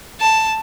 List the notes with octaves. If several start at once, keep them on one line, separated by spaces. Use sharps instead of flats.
A5